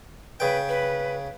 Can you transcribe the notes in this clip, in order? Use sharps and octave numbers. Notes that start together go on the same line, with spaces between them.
C#3 B4 G5
B4